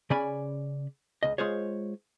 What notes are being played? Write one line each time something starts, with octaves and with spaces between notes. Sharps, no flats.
C#3 C#4 D5 G#5 B5
C#2 D#5
G#3 F4 G#4 C5 C#5